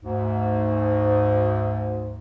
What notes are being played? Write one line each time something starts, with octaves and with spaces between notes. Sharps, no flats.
D2 G#2